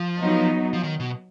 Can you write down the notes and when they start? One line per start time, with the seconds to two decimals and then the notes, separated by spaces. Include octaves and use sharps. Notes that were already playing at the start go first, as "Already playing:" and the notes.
Already playing: F3
0.20 F#3 B3 D#4
0.73 F3
0.83 D#3
1.00 B2